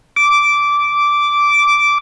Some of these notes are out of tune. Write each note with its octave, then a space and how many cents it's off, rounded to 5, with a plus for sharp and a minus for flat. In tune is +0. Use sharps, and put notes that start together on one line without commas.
D6 -10